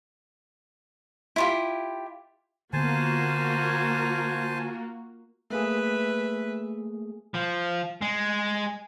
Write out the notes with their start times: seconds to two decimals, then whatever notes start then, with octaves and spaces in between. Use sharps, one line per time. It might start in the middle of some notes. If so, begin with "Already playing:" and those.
1.36 E4 F4 G4
2.73 D3 A#3 B3 F4 F#4 C5 G#5 A5
5.51 A3 A#3 G#4 B4 E5
7.35 F3
8.01 G#3